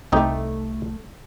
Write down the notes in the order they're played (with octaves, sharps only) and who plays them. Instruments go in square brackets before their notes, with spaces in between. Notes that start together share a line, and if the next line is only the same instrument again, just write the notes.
[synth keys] C2 A3 [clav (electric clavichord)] C4 D#4 G4